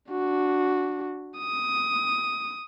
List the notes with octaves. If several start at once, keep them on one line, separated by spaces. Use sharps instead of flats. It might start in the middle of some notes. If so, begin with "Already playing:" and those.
D4 F#4
D#6